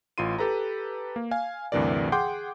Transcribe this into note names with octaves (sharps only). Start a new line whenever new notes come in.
A1 F4 C6 D#7
G4 A4 B4 A#5
A#3
F5 G#5
D2 G2 C3 E3 A#4 D5
G#4 F#5 G5 C6 D6 G6